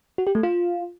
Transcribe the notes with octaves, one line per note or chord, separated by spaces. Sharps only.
F#4
G4
A3
F4